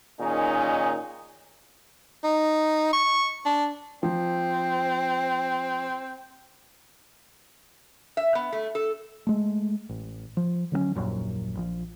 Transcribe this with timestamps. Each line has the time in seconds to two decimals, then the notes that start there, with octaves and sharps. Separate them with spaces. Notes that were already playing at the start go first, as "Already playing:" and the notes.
0.20 A#2 D#3 C#4 D#4 G#4
2.24 D#4
2.93 C#6
3.46 D4
4.03 F3 C4
8.17 E5
8.35 B3
8.52 A3
8.75 A4
9.27 G#3 A3
9.89 A1
10.37 F3
10.72 D3 F#3 A#3 C#4
10.95 D#1 A#1 F#2 A#2
11.57 A#1 F3